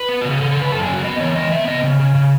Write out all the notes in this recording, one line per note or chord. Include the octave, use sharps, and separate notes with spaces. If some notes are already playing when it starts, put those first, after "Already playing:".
Already playing: B4
B3
F#4
C#3
G#4
C#3 A4
A4
C#3
B4
F#2 A4
G#4
C#3
F#4
B3 D#5
E3 C#5
G#3 D#5
B3 E5
C#3 D#5
C#3
C#3
C#3